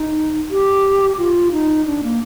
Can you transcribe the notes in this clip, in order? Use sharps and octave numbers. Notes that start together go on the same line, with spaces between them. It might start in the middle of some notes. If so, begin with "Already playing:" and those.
Already playing: D#4
G4
F4
D#4
D4
A#3